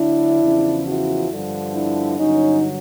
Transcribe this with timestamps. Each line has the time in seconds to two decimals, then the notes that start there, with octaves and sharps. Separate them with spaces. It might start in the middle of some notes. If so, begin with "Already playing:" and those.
Already playing: D2 D3 F#3 D4 E4
0.41 E2 C#3 F3
0.85 E4 F#4
1.30 G2 D3 F3
1.74 D4 E4
2.18 G2 D3 F#3 C#4 D#4